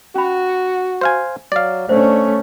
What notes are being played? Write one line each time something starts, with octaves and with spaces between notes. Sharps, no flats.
C#4 F#4 B5
C5 F5 G#5
F#3 D5 F5
A3 C#4 D4 C5